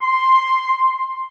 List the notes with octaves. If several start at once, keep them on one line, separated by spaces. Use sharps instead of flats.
C6